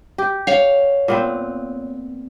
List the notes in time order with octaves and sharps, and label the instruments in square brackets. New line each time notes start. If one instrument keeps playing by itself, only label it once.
[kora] G4
[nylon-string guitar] C#5 F5
[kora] A#2 B3 C4